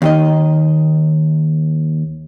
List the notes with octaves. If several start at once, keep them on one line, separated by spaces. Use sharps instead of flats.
D#2 D#3 D#5